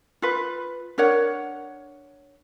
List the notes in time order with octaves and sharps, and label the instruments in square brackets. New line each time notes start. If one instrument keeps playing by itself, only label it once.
[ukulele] F4 B4
D4 A#4 C#5 F#5